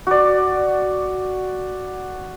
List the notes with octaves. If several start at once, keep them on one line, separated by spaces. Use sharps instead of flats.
F#4 D5